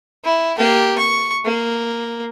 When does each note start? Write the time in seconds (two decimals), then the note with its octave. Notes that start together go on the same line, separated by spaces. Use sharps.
0.25 E4
0.58 A#3 G4
0.98 C#6
1.45 A#3